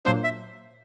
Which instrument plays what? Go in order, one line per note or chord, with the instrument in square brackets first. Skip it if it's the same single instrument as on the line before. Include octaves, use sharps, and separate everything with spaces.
[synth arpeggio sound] A#2 F#3 A#3 D4 [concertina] C5
[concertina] E5